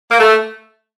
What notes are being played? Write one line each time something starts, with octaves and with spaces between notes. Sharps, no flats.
A#3
A3